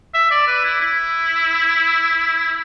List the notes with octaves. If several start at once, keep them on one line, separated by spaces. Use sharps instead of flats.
E5
D5
B4
E4
E4